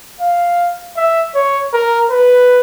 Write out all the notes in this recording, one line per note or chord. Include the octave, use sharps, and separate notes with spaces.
F5
E5
C#5
A#4
B4